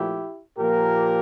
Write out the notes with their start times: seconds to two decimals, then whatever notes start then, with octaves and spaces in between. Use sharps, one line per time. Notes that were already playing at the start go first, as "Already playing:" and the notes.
Already playing: A#2 F3 A3 E4 G4
0.58 A#2 F3 A#3 G4 A#4